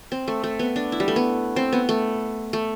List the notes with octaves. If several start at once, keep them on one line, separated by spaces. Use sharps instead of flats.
C4
A3
A3
B3
D4
E4
G3
A3
B3
C4
B3
A3
A3